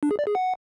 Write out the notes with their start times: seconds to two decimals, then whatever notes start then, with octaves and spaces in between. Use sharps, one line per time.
0.03 D4
0.11 G#4
0.19 D5
0.27 G#4
0.35 F#5